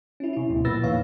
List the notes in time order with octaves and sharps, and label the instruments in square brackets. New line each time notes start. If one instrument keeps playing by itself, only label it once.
[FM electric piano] C#4 E4
C3 E4
D2 G2 B2
A#2 F3 B4 E6 A6 A#6
E2 A#2 D#3 C#5 F5